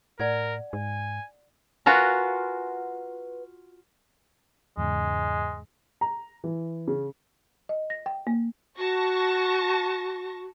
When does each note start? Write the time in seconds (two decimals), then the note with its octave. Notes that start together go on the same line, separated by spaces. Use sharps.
0.20 A2 A#4 D5 F#5 G#6
0.73 G#2 G#5
1.86 F4 F#4 A#4 B4 F#5 G#5
4.77 E2 G#2 C#3 G#3
6.01 A#5
6.44 E3
6.88 C#3
7.69 D#5
7.90 A#6
8.06 G5
8.27 A#3
8.78 F#4 A5 C#6 A#6